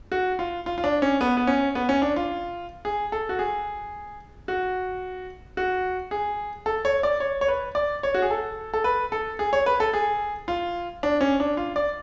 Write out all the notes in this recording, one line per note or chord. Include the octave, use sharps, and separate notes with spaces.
F#4
F4
F4
F4
D4
C#4
B3
B3
C#4
B3
C#4
D4
F4
G#4
A4
F#4
G#4
F#4
F#4
G#4
A4
C#5
D5
C#5
C#5
B4
D5
C#5
F#4
G#4
A4
A4
B4
A4
G#4
C#5
B4
A4
G#4
F4
D4
C#4
D4
F4
D5